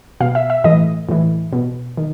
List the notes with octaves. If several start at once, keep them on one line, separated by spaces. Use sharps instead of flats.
B2 F5
E5
E5
A2 E3 D#5
A2 E3
B2
D#3